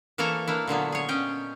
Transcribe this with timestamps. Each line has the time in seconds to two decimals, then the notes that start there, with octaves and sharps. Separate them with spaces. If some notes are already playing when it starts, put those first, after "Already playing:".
0.18 E3 A#3 A4 C#5 G#5 A#5
0.47 A#3 D4 E4
0.67 A#2 D3 F#3 B3
0.92 G#4 C#5
1.09 C#4 D#5 G5